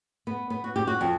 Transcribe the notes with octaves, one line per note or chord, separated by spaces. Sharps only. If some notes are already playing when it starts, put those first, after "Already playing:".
B3
B3
F#4
G4
F#4
F2